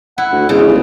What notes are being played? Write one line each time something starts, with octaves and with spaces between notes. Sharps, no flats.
E4 F#5
D2
E2 C#3 G#3
G1